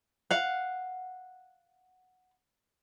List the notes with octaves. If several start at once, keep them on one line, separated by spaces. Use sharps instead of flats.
F5 F#5